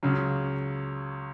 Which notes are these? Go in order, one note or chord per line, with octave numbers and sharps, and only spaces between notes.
C#2 C#3 F#3